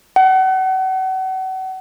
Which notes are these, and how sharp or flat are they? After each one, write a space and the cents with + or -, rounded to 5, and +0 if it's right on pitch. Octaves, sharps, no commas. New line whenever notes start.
F#5 +35